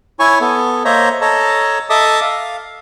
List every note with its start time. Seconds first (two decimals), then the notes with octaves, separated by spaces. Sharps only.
0.19 E4 C#5 G#5 C#6
0.41 B3 A4
0.85 A#3 C5 C#5 D#5 E5 A#5
1.21 A4 C#5 D#5 A5 A#5
1.90 A4 D#5 E5 A5 D6 D#6
2.22 F5